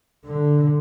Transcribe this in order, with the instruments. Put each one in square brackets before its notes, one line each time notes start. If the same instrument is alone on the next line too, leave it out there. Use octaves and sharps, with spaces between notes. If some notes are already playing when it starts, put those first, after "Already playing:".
[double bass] D3